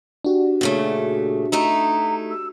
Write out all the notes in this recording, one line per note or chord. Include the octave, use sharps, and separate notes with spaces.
D4 F#4 G4
A#2 C#3 A3
A3 D#4 E4 A#5
E6